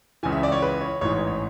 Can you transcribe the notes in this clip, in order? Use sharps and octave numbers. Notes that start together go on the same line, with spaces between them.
C#2 C#3 E3 G#5
E5
D5
C#5
B4
C#5
A1 G#2 E3 C#5
C#5
C#5